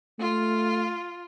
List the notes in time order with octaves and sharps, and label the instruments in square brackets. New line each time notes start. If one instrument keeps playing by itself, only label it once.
[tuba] A3 [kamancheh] F4